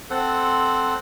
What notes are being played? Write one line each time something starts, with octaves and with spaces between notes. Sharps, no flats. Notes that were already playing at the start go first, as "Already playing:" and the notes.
C4 A4 C5 F#5